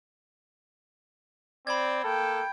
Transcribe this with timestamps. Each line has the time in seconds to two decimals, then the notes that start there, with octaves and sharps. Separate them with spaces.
1.67 C4 D5 B5 G#6
2.04 A#3 A4 G5